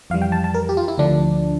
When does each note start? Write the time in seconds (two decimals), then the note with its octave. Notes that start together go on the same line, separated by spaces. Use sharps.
0.10 F2 E3 G3 F5
0.22 G5
0.32 A5
0.44 A5
0.54 A#4
0.69 G4
0.77 F4
0.88 E4
0.98 D2 D3 F3 D4